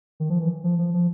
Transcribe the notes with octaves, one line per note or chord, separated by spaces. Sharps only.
D#3
F3
E3
F3
F3
F3